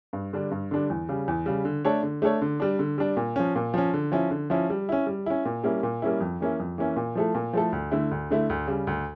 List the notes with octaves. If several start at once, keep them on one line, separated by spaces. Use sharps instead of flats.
G2
D3 G3 D4
G2
D3 G3 D4
E2
C#3 G3
E2
C#3 G3
D3
A3 D4 A4 C#5
D3
A3 D4 A4 C#5
D3
G3 D4
D3
G3 D4
A#2
F3 C#4
A#2
F3 C#4
D3
F3 C#4 E4
D3
F3 C#4 E4
G3
C#4 E4
G3
C#4 E4
A#2
G3 A#3 C#4 E4
A#2
G3 A#3 C#4 E4
F2
E3 A#3 C#4 E4
F2
E3 A#3 C#4 E4
A#2
F3 A3 E4 A4
A#2
F3 A3 E4 A4
D2
D3 A3 E4
D2
D3 A3 E4
D2
C#3 G3
D2